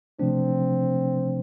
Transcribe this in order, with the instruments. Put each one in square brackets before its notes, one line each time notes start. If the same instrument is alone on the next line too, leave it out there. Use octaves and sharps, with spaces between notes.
[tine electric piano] C3 F3 A3 D4 [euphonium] C4